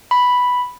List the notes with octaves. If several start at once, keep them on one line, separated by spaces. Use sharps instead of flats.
B5